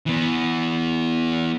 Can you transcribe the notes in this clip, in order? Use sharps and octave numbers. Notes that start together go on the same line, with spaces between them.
E3 B3